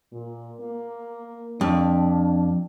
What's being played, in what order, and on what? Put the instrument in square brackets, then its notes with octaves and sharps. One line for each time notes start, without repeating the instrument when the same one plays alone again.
[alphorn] A#2
A#3
[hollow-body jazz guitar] F2 [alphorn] D4